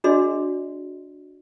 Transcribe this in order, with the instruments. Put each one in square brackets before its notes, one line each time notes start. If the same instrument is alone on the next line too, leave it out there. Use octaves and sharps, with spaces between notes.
[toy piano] D4 F#4 G#4 D5 D#5 C6